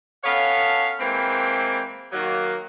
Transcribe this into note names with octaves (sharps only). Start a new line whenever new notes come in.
B3 C#4 A4 C#5 F5
E3 G#3 A#3 C4 B4 G5
D#3 F#3 A#3